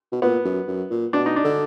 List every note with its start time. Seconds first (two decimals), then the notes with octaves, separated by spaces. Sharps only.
0.12 B2
0.22 A#2 B3
0.45 F#2
0.67 F#2
0.90 A#2
1.13 B2 D4
1.26 D#4
1.36 D4
1.44 D3